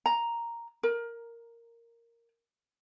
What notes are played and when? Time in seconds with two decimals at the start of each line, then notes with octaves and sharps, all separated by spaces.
0.06 A#5
0.83 A#4